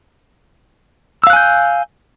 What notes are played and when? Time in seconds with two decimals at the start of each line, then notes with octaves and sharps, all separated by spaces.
1.24 E6
1.27 F5
1.30 F#6
1.33 G#5
1.36 G6